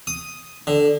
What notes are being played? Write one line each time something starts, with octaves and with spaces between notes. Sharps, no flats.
D#6
D3